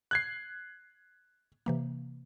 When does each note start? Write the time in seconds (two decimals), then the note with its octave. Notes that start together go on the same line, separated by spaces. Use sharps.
0.11 F#6 G#6 C7
1.66 C3 E3 A#3